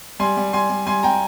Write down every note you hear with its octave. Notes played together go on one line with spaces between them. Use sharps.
G3 G#5 C6
G3
G3 G#5 C6
G3
G3 G#5 C6
G3 G5 A#5